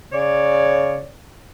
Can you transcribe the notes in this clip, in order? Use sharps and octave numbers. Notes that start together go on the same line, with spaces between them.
C#3 C#5 D5